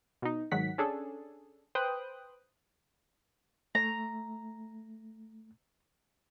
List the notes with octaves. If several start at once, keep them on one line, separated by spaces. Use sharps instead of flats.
B2 D#4
G#2 D#3 F#3 F#5 B6
C#4 D4 G#4 A4
B4 C5 G5 D#6 F#6
A3 A#5